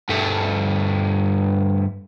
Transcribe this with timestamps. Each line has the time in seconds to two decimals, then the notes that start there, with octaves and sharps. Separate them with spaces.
0.09 G2 A3